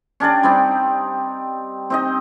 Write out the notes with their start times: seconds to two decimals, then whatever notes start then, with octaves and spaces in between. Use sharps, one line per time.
0.20 C#4 D4 G4 D5
0.43 G3 C4 D#4
1.90 C4 D#4 D#5